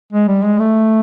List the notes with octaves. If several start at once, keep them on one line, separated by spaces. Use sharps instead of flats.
G#3
G3
G#3
A3